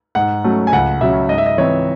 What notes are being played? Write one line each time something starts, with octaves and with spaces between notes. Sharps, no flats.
G#2 F#5
F#3 A3 C#4
G#5
C#2 F#5
C#3 F#3 C#4 E5
G#2 D#5
E5
D#5
E3 C4 C#5